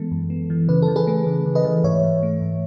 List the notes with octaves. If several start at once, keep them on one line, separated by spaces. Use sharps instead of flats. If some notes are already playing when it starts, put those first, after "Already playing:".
Already playing: E3 G#3 B3 A4
F#2
B3
E3
C#3 B4
A4
E3
G#4 B4
A3
C#3
C#3
B4 D#5
E3
G#2 C#5 E5
E3
A3
G#2